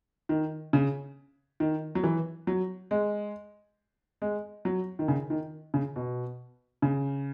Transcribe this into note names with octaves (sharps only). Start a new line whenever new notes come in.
D#3
C#3
D#3
F#3
E3
F#3
G#3
G#3
F#3
D#3
C#3
D#3
C#3
B2
C#3